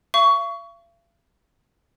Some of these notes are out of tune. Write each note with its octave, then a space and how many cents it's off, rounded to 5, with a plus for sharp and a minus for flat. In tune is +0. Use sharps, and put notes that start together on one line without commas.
F5 -45 C#6 +20